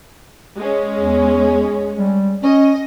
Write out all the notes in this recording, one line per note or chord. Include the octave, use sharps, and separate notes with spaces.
G#3 C#4
E2
G3
C#4 D#5